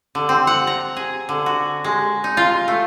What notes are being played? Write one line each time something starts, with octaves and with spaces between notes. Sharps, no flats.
D3
C4
F#5
A#5
G#4
D3
F#4
G#3
D#4
F4
A3